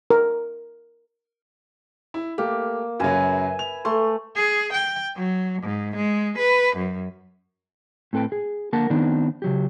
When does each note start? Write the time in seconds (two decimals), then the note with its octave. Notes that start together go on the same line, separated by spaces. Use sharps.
0.10 A#4
2.14 E4
2.38 A3 A#3 G4
3.00 F#2 C#3 F#3 B4 E5 G#5
3.59 F7
3.85 A3 C6
4.36 G#4
4.73 G5
5.16 F#3
5.62 G#2
5.96 G#3
6.38 B4
6.76 F#2
8.13 A2 C4 A4 B4 G5
8.32 G#4
8.73 D3 A#3 A#4 F#5 A5
8.90 D#3 B3 C4 D4 D#4
9.42 C#3 F#3 G4